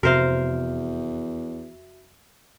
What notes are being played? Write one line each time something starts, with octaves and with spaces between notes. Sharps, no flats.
F1 E2 C3 F#4 A#4 C5 E5 F5